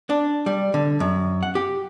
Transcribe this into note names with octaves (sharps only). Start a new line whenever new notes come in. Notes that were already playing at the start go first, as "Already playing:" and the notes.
D4
G3
D3
F#2
F#5
G4